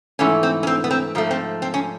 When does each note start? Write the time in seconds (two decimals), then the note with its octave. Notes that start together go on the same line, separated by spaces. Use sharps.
0.19 G#2 E3 A3 C#4
0.43 C4
0.63 C#4
0.67 C4
0.84 B3
0.91 C4
1.15 G#2 F3 A3
1.31 C4
1.62 C4
1.74 C#4